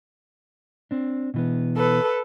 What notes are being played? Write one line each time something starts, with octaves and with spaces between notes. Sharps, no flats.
C4 D4
B2 E3 B3
A4 B4